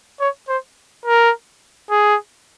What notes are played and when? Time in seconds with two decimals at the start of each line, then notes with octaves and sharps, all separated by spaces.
0.20 C#5
0.49 C5
1.06 A#4
1.90 G#4